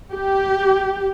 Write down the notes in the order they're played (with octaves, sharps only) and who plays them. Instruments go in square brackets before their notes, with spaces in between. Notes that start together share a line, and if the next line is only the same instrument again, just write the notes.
[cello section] G4